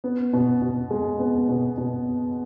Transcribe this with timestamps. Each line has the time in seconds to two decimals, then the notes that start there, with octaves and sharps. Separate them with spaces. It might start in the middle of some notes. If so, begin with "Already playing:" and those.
0.04 B3
0.33 B2
0.62 B2
0.91 G#3
1.19 B3
1.49 B2
1.78 B2